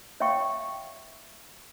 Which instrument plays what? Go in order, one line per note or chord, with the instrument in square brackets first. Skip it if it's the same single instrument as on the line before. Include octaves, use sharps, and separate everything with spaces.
[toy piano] C#5 E5 F5 G5 C#6